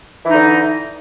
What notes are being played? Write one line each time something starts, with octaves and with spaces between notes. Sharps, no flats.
D3 E3 D#4